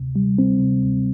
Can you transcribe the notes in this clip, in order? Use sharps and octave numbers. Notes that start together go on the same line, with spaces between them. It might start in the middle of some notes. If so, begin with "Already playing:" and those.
Already playing: D2 C3
G3
C4
C3
D2